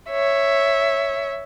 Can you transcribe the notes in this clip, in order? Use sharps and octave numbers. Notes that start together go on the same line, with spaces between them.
C#5 E5